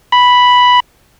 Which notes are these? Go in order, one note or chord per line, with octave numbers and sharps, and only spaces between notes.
B5